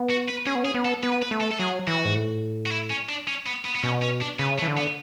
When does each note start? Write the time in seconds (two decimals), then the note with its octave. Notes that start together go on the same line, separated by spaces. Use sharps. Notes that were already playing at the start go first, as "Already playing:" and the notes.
Already playing: B3
0.10 F#4
0.29 B4
0.46 C#4 G#4
0.55 B3
0.63 C#4 G#4
0.74 B3
0.85 A4
1.03 B3 B4
1.22 B4
1.31 A3
1.41 A4
1.51 A4
1.59 F#3 G#4
1.87 E3 F#4
2.05 G#2
2.15 A2
2.66 F#4
2.71 E4
2.90 C#4
3.09 D4
3.28 C#4
3.46 B3
3.64 B3
3.75 B3
3.83 B2 C#4
4.02 C#4
4.21 D4
4.39 C#3 B3
4.58 A3
4.62 E3
4.68 D3
4.77 B3